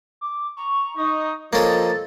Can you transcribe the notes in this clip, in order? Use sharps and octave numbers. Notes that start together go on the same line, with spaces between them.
D6
A#5 C#6
D#4 D#6
F3 A#3 C#4 A4 D#5 A6